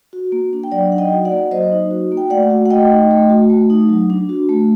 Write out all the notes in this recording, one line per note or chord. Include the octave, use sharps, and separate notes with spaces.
F#4
A#3
D4
G5
F#3 D5 F#5
D#4 F#5
D#5 G5
F#4
D5 F#5
A#3
F#3 C5 D#5
D#4
F#4
A#3
G5
A3 D5 F#5
F#4
F#5
A3 D#5 G5
D#4
A3
F#4
A3
D#4
F#3
D4
F#4
A3